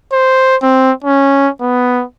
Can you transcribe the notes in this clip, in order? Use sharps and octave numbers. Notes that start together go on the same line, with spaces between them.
C5
C4
C#4
B3